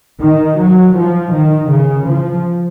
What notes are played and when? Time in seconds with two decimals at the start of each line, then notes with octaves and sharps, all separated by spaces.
0.20 D#3
0.58 F#3
0.95 F3
1.32 D#3
1.69 C#3
2.06 F3